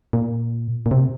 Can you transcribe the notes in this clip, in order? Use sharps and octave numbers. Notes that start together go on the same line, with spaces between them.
A#2
A#2
C3